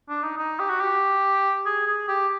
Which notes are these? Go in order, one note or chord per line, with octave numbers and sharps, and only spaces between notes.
D4
D#4
D#4
G4
F#4
G4
G#4
G#4
G4